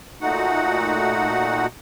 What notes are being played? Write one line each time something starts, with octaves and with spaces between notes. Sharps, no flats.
A#2 A3 D#4 F#4 F#5